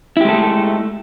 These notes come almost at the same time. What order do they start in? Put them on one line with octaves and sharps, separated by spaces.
E4 G4 G#3 A4 A3